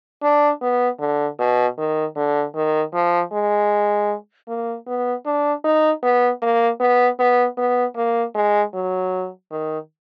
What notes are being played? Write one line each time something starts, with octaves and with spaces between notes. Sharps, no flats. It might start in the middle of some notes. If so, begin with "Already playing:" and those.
D4
B3
D3
B2
D#3
D3
D#3
F3
G#3
A#3
B3
D4
D#4
B3
A#3
B3
B3
B3
A#3
G#3
F#3
D#3